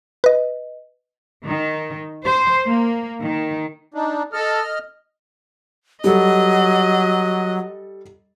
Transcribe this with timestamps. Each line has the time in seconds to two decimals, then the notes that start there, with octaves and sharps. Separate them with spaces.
0.24 B4 D#5
1.45 D#3
2.24 C5
2.66 A#3
3.23 D#3
3.94 D4 D#4
4.33 A4 D#5 F6
6.04 F#3 G3 A4 D#5